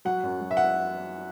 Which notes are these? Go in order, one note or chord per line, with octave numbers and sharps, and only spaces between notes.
F#3 F#5
F#2
F#3
E5
F#5